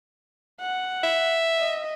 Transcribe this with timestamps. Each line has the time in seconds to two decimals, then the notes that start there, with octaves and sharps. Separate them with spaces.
0.61 F#5
1.04 E5
1.58 D#5